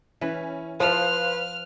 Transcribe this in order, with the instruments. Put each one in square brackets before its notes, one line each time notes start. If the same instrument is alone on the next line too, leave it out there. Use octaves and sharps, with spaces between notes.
[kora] E3 B4 [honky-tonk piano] C#4
[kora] F3 [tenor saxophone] B4 [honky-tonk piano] C5 F5 [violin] F6